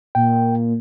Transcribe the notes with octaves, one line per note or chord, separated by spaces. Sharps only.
A#2 G5